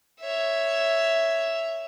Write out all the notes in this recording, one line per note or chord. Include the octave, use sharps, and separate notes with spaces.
C#5 E5